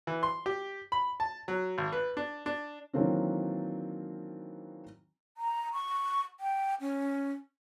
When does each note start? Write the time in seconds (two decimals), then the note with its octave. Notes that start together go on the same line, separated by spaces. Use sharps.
0.07 E3
0.23 C6
0.46 G4
0.92 B5
1.20 A5
1.48 F#3
1.78 G#1
1.93 B4
2.17 D4
2.46 D4
2.93 D#3 E3 F#3 A#3 C4 D4
5.37 A#5
5.73 C#6
6.40 G5
6.80 C#4